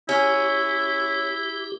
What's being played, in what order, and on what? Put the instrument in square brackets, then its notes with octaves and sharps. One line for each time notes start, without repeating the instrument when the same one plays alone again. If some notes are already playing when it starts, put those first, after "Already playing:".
[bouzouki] C#4 [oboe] E4 [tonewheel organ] G4